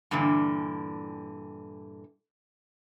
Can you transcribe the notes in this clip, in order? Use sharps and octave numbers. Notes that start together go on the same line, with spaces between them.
G2 A#2 D3 E3